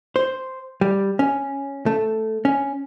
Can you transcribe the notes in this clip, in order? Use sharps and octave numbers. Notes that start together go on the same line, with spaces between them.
C5
G3
C#4
A3
C#4